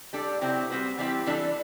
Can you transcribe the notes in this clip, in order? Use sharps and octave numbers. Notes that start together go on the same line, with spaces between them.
G3 D4 A4
C3 F#3 C4 E4 G4
G3 C4 F#4 B4
E3 G3 C4 E4 G4
E3 G3 D4 A4